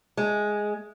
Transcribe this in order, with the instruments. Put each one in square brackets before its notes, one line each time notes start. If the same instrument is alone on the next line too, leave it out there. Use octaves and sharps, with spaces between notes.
[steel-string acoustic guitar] G#3